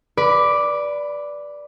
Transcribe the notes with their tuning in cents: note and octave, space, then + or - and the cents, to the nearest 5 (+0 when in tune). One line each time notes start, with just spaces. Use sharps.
B4 -25 D5 +0 B5 +15